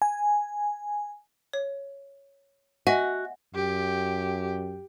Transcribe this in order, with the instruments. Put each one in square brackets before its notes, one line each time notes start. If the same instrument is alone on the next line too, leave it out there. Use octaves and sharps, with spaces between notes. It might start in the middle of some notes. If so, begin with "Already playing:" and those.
[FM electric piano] G#5
[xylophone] C#5
[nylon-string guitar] F#4 [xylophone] D#5 E5 G#5
[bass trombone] F#2 [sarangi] G4